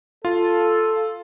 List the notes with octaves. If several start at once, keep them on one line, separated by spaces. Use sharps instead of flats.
F4 A4